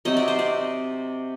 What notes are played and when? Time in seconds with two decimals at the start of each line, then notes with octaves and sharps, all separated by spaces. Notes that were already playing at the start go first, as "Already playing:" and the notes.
0.05 C3 F#3 C4 D#4 D#5
0.17 D5
0.28 C5
0.39 D5